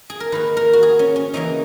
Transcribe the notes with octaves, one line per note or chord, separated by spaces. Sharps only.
G#4
A#4
D#3 A#3 B4
A#4
F#4
G#4
C#4
C#4
C#3 E3 A#3 D#4